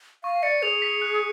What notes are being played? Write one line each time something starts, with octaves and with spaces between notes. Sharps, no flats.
F5 C#6
D5 C#7
G#4 F7
B6
F#6